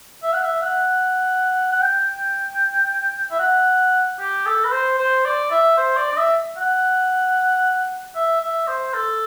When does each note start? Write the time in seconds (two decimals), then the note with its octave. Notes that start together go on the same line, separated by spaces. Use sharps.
0.23 E5
0.32 F#5
0.42 E5
0.62 F#5
1.72 F#5
1.82 G5
3.31 E5
3.39 F#5
4.19 G4
4.46 A4
4.64 B4
4.72 C5
4.98 C5
5.25 D5
5.51 E5
5.77 C5
5.97 D5
6.12 D5
6.17 E5
6.57 F#5
8.16 E5
8.41 E5
8.67 C5
8.94 A4